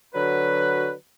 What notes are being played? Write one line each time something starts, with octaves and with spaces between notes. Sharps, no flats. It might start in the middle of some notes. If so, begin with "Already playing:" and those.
D3 F#3 F#4 B4